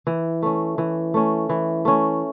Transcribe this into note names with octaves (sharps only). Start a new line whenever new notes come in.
E3
A3 C#4
E3
A3 C#4
E3
A3 C#4